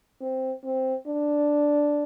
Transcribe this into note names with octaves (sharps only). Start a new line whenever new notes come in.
C4
C4
D4